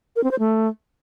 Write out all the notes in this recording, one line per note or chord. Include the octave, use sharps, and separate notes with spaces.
A#4
C4
C5
A3